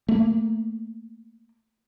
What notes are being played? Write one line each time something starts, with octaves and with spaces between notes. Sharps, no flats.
A3 A#3